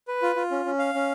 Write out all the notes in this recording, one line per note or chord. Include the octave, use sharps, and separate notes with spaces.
B4
F4
F4
C#4
C#4
F5
C#4